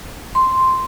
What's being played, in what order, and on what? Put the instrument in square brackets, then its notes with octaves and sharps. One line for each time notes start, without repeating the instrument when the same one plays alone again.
[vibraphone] C6